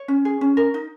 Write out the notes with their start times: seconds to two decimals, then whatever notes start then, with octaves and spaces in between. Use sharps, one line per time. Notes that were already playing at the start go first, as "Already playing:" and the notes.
Already playing: C#5
0.08 C#4
0.25 G#4
0.41 C#4
0.57 A#4
0.74 D#4